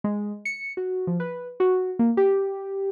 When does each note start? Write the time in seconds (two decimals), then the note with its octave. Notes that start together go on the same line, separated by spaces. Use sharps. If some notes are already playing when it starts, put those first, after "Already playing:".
0.04 G#3
0.45 C#7
0.77 F#4
1.07 F3
1.20 B4
1.60 F#4
1.99 A#3
2.17 G4